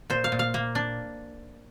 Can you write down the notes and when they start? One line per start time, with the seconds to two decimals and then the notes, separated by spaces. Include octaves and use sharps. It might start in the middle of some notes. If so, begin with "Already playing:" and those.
0.10 A#2 C5
0.24 F5
0.32 A#2
0.39 F5
0.54 A#3
0.75 D4